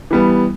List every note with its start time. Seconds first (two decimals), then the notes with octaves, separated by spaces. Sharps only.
0.11 E3 G3 B3